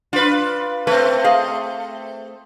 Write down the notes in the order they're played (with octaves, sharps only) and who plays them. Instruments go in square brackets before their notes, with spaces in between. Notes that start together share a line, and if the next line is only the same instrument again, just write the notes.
[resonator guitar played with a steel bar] D4 [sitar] F4 B4
[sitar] A3 C4 [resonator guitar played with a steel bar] B4
[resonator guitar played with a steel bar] G#4 D#5 F5